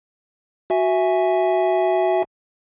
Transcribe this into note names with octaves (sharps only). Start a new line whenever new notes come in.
F#4 E5 G#5